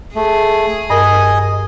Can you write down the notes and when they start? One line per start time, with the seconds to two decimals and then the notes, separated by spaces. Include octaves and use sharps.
0.16 A3 G#4
0.90 G2 A#4 D#5 G#5